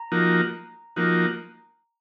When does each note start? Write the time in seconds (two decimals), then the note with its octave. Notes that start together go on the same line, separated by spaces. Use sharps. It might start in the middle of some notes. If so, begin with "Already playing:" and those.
Already playing: A#5
0.12 F3 A#3 D#4 F#4
0.96 F3 A#3 D#4 F#4